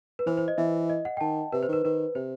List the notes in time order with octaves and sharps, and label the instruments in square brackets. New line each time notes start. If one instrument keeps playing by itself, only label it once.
[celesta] B4
[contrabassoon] E3 [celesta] C5
[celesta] C5
D#5
[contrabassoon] E3 [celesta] E5
[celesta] D#5
F#5
G5
[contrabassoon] D#3 [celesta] A5
[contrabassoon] C3 [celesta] B4
[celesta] C5
[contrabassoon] D#3 [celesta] B4
[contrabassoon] D#3 [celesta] B4
[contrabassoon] C3 [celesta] C5